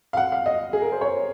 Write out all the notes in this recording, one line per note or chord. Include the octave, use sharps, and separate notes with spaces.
F5
F#5
F5
D#5
G#4
A#4
C5
C#5